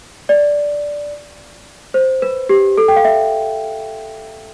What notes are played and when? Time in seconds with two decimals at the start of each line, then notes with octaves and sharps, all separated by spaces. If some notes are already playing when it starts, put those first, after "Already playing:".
0.29 D5
1.94 C5
2.22 B4
2.49 G4
2.78 A4
2.88 G5
2.96 F5
3.05 E5